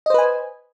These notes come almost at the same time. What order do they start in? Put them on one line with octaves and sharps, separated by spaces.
D#5 C5 B4 G#5